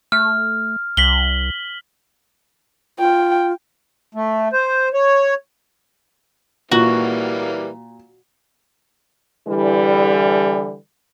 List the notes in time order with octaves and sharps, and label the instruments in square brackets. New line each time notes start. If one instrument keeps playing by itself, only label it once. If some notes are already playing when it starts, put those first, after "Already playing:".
[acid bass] A3 [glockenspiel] F6
[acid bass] C2 [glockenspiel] B6 F#7 G7
[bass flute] F4 [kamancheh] G5
[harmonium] A3
C5
C#5
[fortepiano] A#2 [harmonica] E3 G3 A#3 [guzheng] F#4
[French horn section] D3 E3 G3